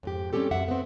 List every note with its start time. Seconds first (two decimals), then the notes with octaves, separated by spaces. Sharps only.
0.03 F2 G#2 G4
0.33 G3 C4 C#4 G4 A4
0.51 F#2 E5 F#5
0.68 B3 C4